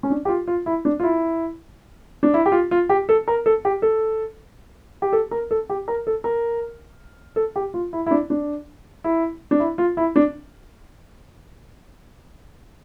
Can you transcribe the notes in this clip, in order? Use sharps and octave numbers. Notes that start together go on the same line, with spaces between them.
C#4
D4
G4
F4
F4
E4
D4
F4
E4
D4
E4
G4
F4
F4
G4
A4
A#4
A4
G4
A4
G4
A4
A#4
A4
G4
A#4
A4
A#4
A4
G4
F4
E4
E4
D4
D4
E4
D4
E4
F4
E4
D4